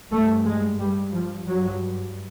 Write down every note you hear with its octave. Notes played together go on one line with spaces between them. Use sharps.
G2 A3
G#3
G2 G3
F3
G2 F#3